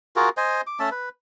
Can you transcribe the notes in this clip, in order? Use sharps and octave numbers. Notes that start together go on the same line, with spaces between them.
F4 F#4 G#4 A#4
C5 D#5 G#5
D6
A3 C#4 E5 A5
B4